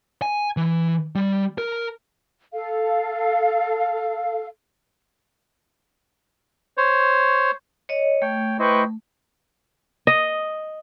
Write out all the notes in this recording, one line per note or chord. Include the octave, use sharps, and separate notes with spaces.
G#5
E3
G3
A#4
A4 F5
C5 C#5
C#5 D#5
A3 C#5 G5
E4 B4 C5 D#5 G5 C#6
D#5